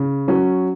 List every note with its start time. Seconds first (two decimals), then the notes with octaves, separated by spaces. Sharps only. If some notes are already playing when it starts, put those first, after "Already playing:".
Already playing: C#3
0.28 F#3 C#4